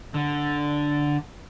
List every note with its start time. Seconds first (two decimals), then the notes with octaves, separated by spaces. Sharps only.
0.14 D3